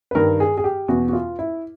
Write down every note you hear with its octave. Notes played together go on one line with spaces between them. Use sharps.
B4
G2 D#3 A#4
G#4
G#4
G4
E2 B2 F#4
F#4
F4
E4